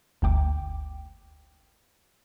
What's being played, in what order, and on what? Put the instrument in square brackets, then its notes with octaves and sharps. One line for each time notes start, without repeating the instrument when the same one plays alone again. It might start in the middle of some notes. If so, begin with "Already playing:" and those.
[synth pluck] G1 D2 G5 D6